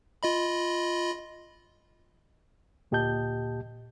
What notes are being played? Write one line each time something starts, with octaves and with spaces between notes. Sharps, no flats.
F4 D#5 B5
D2 A#2 G4 D#5 A5 G6